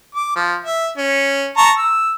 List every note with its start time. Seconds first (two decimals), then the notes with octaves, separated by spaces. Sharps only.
0.15 D6
0.36 F3
0.64 E5
0.97 C#4
1.57 A5 A#5 C#6
1.78 E6